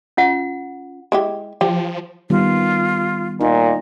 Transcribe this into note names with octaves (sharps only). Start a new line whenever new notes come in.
C#4 F4 F#5
G#3 E4 G4
F3 G4
D#3 G3 B3 F4
A#2 D#4 D#5